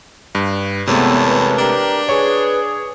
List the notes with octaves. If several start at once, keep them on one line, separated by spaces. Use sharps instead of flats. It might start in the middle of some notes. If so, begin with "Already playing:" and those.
G2
E2 C3 G#3 A3 B3 A#4 C#5 A5
B4
D4 G4 A#4
G#4 B4 C#5 C#6